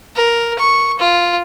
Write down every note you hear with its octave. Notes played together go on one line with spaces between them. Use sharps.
A#4
C#6
F4